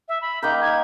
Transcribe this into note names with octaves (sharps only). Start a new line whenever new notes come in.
E5
B5
D#3 A#3 A#4 G6
G#6